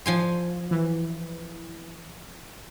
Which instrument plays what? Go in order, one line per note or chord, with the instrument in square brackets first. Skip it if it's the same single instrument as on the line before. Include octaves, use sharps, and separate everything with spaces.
[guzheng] F3 G#5 C6
[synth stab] E3